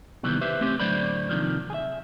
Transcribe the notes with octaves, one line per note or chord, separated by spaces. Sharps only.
C3 D#3 E3 G3 B3
G4 B4 C5 E5
A3 C4 C#4 G4
A2 D3 F#3 C5 D5 B5
D#2 G#2 C3 D#3 F3
G#4 E5